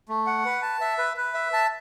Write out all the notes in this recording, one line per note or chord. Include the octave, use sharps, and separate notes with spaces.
A3
F#5
B4
A5
E5
B4
B4
E5
A5